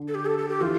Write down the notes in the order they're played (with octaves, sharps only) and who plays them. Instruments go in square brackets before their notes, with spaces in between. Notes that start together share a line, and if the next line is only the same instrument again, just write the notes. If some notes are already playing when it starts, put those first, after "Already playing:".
Already playing: [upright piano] D3
[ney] A4
G4
A4
A4
G4
[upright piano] E3 [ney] F4